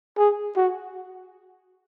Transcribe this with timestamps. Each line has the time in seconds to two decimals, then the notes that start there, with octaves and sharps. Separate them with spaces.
0.18 G#4
0.56 F#4